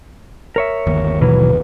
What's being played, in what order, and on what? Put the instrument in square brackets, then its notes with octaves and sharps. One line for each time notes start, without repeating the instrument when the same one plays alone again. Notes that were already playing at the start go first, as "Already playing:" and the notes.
[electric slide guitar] A#4 C#5 E5
[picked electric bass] G1 D#2
[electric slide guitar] B2 E3 F#3 [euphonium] B4